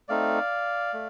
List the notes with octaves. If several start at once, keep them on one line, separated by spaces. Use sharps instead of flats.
A3 C4 D#4 D5 F5
A3